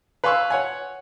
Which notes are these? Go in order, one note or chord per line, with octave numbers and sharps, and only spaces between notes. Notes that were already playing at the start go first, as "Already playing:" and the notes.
B4 F5 G#5 C6 C#6 E6
C#5 F#5 G#5